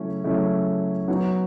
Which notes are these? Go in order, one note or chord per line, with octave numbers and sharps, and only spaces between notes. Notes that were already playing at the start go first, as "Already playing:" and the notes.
Already playing: C#3 F#3 A3 C#4 E4
C#3 F#3 A3 C#4 E4
F#3 B3 D#4 F#4 C#5